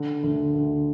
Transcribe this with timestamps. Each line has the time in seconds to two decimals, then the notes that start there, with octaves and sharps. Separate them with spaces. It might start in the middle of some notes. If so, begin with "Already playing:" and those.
Already playing: D3
0.24 D2
0.55 D2